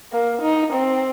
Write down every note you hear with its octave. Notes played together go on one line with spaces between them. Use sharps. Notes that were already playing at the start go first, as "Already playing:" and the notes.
A#3
D#4
C4